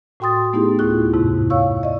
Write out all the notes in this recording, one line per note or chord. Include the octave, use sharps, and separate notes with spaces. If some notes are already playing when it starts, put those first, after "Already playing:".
A2 F#4 G5 C6 D#6 A6
A3 B3 D#4 E4 G4 G#4
D2 A2 E4 F4 G#4 F#6
F2 G#2 C3 E4
C#5 F5 C#6 E6
D5 D#5